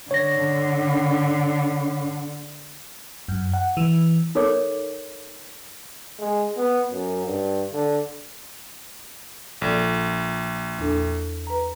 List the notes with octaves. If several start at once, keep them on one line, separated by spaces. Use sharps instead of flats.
D3 C#5 A#6
F#2
F#5
E3
D#4 A4 A#4 C#5 D6
G#3
B3
F#2
G2
D3
A#1 A4 D5
E2 D4 A4
B4 A#5